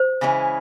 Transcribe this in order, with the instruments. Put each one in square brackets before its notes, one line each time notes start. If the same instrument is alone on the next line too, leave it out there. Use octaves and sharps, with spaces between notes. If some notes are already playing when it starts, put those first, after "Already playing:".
Already playing: [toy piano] C5
[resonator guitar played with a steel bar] C#3 E3 G#3 C#4 E4